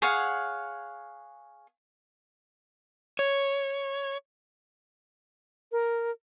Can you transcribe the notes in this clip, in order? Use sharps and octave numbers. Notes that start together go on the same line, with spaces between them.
G#4 C#5 F5 F#5
C#5
A#4